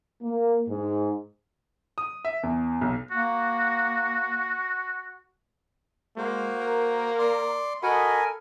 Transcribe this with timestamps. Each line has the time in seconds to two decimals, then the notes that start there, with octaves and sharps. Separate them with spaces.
0.22 A#3
0.67 G#2
1.98 D#6
2.25 E5
2.43 E2
2.81 B1
3.11 A#3 F#4
6.17 G#3 A#3 F#4 C5
6.61 A#4
7.19 D5 C6
7.83 F#4 A4 A#4 D#5 G#5 B5